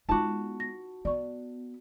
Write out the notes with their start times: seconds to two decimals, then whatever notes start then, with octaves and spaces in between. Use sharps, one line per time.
0.09 G#3 B3 D#4 F4 F#4 A5 D6
0.60 A#6
1.05 B3 D5 C#6